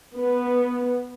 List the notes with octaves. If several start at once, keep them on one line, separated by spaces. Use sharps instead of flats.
B3